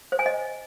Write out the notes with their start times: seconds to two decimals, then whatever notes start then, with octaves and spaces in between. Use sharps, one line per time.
0.12 C5
0.19 G#5
0.26 D#5